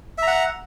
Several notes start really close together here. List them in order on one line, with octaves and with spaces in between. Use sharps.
E5 A#5 F#5